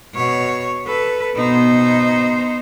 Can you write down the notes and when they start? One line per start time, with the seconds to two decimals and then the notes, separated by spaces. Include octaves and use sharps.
0.14 B2 C#5
0.87 A4 B4
1.36 B2 B3 D#4 C5